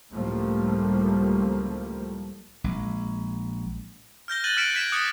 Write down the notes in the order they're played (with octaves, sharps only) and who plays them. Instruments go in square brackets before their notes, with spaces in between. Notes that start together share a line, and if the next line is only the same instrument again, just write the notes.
[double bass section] C#2 A2 F3 G3 A3 A#3
[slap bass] A#1 G#3
[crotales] F6 G6 A#6 G7
F#6 G6 A6 D#7 F#7
F6 F#6 B6 C#7 D7 E7
F#6 G#6 B6 D7 E7
D6 D#6 F#6 A6 C#7